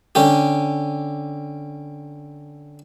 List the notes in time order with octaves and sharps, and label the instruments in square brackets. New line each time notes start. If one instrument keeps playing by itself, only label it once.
[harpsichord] D3 C#4 G4